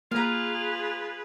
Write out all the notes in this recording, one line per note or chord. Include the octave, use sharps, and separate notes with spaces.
A#3 F4 G#4 B4 A#5 F6